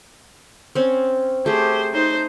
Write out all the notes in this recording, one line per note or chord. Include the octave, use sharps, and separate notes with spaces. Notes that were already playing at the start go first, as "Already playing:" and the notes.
C4 C#4
A3 G4 G#4 C5
D#4 C5